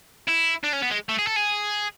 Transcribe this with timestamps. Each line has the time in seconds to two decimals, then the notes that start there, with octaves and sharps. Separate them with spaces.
0.28 E4
0.64 D4
0.73 C#4
0.82 B3
0.91 G#3
1.09 A3
1.19 G#4
1.27 A4
1.36 G#4